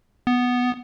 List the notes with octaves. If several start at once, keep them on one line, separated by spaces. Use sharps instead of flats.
B3